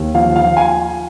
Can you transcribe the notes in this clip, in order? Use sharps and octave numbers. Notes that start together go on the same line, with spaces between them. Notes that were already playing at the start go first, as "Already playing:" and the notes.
Already playing: D#2
F3 F5
F3 F5
G#5